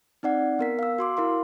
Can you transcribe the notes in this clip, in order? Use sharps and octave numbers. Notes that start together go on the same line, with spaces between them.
C4 D#4 D5 F#5
B3 A#4 B6
F5 E6
F#4 C6 D6
E4 A#4 F5 C6